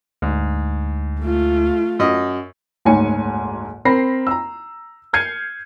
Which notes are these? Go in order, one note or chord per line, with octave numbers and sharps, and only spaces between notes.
D2 G#2
A3 F4
F#2 D#5
F#1 D2 G#2 C#5 G#5 C#7
C4 A#4 B5 A#6 C7
A#5 E6
F6 G6 G#6 C7 C#7 D#7